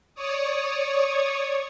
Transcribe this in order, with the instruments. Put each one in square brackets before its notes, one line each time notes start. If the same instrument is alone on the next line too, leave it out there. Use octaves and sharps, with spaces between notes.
[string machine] C#5 D5 C#6 D#6